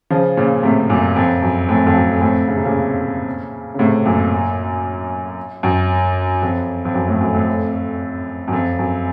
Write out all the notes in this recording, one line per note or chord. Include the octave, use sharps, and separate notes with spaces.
C#3 F3
A#2 C#3
A2 C3
F#2 A#2
F2
F#2
F2 A2
F2
F#2
F2 A2
C#3
C3
A#2 C#3
C#3
A2 C3
F#2 A#2
F#2
F2
F2
F#2
F2 A2
F#2
F2 A2
F#2
F2
F#2